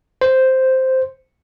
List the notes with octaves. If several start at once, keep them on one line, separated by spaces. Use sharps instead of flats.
C5